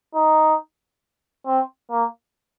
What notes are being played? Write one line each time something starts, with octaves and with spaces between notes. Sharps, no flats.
D#4
C4
A#3